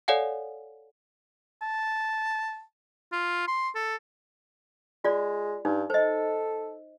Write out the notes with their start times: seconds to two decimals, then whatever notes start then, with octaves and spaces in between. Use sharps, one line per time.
0.08 A4 C#5 D5 F5 F#5 G#5
1.62 A5
3.12 F4
3.47 C6
3.75 A4
5.04 G#3 F4 D5
5.65 G2 D#4
5.90 A4 C5 D#5